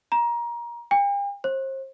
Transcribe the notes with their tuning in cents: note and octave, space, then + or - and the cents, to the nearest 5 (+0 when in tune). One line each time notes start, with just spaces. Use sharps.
A#5 +25
G5 +45
C5 +35